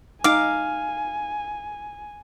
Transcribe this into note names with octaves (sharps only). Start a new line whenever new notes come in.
D#4 F5 G#5 D6